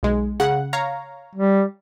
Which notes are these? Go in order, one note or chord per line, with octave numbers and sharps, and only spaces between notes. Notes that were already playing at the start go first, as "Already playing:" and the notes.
B1 G#3
C#3 F#5
C#5 F5 A#5
G3